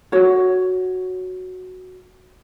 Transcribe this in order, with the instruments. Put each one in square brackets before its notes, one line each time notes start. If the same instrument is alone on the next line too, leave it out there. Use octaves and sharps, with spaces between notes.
[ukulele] F#4 C#5